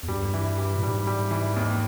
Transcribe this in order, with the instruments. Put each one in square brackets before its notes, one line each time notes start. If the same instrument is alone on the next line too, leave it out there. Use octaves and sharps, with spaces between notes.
[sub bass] E2
[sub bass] G2 [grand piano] G3
[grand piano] E3
G3
[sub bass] A#2
[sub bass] G#2 [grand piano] G3
[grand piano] G3
E3
D#2